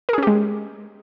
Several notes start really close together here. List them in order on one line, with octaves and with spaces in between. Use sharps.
A#4 G#4 C#4 G4 G#3